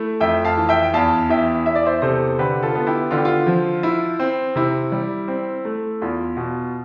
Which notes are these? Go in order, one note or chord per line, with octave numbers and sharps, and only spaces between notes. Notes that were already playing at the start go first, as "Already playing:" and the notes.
Already playing: A3 E4
F2 E5 G5
F5 A5
E3
E5 G5
G5
E2 F5 A5
E3 E5 G5
E2 E5
D5
C5 E5
C3 A4 C5
D3 G4 B4
F4 A4
B3
E4 G4
D3 F4
G4
F4
F3
E4
C4
C3 E4
G3
C4
A3
E2 F4
B2